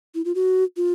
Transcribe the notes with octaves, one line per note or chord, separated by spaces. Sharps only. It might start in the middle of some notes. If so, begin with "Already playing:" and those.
E4
F4
F#4
F4